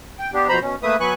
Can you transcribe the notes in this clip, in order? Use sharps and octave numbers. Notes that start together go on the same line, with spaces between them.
G5
B3 D4 G4
F2 B2 C5 A#5 B5
B2 C#4
A3 A#3 B4 E5 D#6
F#3 B3 B4 G#5 C#6 F#6